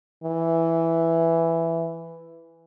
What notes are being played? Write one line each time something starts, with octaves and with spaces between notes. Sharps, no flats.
E3